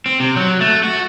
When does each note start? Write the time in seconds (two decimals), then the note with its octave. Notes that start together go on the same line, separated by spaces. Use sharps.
0.06 C4
0.20 C3
0.36 F#3
0.61 A3
0.83 F#4